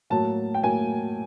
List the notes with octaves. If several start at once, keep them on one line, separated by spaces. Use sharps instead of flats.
A2 F#3 A#3 A5
G5
A2 F#3 A#3 G#5